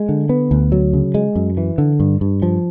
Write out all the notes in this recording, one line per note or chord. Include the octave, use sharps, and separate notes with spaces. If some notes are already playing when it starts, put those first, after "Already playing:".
Already playing: G#3
D3
B3
D2
F#3
C#3
G#3
F#2
E3
D3
G2
G2
F3